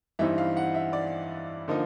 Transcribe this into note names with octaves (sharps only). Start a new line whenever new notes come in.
G2 E3 G3 C4 D#4 E5
F5
F#5
E5
D5
D3 F3 A#3 D#4